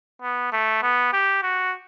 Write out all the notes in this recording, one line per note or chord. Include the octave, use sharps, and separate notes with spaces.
B3
A3
B3
G4
F#4